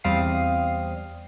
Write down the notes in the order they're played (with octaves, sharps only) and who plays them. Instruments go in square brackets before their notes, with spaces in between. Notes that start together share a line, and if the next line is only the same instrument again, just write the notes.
[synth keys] E2 G3 C4 F5 D#6 C7